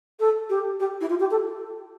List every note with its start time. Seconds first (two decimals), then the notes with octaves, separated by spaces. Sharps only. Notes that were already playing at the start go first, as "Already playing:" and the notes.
0.20 A4
0.49 G4
0.80 G4
1.01 E4
1.09 F4
1.20 G4
1.31 A4